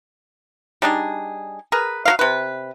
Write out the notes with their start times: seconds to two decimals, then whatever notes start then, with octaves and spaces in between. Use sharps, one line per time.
0.82 G3 D4 D#4 G#4
1.72 G#4 A#4 B4
2.05 F#3 A#3 F5
2.19 C3 B4